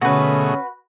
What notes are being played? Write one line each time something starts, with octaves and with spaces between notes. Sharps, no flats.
B2 D3 A3 C#4 F#4 G#4 B4